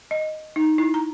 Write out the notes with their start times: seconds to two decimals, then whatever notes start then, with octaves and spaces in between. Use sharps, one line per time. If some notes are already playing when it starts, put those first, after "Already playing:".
0.11 D#5
0.56 D#4
0.78 E4
0.94 A#5